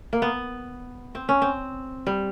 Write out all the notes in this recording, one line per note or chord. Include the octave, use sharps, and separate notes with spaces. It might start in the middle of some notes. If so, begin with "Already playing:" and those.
A#3
B3
C4
C#4
C4
G3